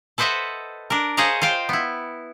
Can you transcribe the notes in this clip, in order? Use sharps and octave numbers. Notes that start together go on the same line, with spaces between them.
A4 B4 C5 D#5 E5 F#5
D4 A#4
G#4 C5 C#5 D#5 F5 A#5
F4 C5 F5 G5
B3 E4